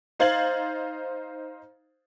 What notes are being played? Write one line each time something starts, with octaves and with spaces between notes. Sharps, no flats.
D#4 C5 F5 G#6 A6 F#7